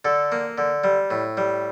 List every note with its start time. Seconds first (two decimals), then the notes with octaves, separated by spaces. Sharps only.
0.05 D3 A4
0.32 A#3
0.58 D3
0.84 G3
1.10 A2
1.37 G3